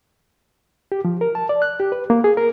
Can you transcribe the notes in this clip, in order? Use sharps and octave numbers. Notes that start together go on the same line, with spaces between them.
G4
F3
A#4
A5
D5
F#6
G4
B4
A#3
G#4
A#4